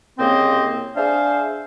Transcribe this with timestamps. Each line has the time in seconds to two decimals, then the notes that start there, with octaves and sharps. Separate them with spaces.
0.19 C2 C#3 A#3 C4 C5 D#5
0.96 D4 G#4 C5 E5 F5